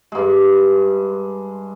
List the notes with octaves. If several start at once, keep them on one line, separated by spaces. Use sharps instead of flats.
G2 G#3